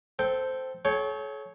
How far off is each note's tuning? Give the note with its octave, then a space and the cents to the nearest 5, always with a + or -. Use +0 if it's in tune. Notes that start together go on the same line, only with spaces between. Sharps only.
C4 -5 A4 +0 G5 +0
A4 -45 C#5 +0 G5 +0